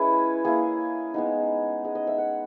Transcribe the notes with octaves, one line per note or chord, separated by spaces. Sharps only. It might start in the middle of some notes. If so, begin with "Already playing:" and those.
Already playing: G#3 C#4 E4 G#4 B4
A#3 E4 G#4
G#3 B3 D#4
G#3 D#4
D#5
E5
F#5